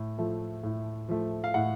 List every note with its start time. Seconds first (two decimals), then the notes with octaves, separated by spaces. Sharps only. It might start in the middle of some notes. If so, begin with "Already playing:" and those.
Already playing: A2
0.18 F3 A3
0.64 A2
1.09 F3 A3
1.44 F5
1.54 A2 F#5